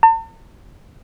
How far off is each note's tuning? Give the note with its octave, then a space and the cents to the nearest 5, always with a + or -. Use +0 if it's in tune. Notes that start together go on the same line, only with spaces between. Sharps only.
A5 +45